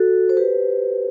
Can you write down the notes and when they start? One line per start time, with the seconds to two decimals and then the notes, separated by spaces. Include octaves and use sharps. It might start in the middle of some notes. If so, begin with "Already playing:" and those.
Already playing: F#4 A4
0.29 C5
0.37 G4 B4